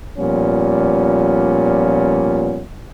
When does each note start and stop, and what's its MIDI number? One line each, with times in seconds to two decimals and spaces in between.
0.18 2.63 46
0.18 2.63 53
0.18 2.63 55
0.18 2.63 59
0.18 2.63 61